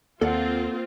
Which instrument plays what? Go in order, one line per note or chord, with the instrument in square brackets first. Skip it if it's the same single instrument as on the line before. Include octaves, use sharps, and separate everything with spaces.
[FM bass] D#2 [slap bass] A#3 [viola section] C4 F4 [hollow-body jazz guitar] A4 D5 F#5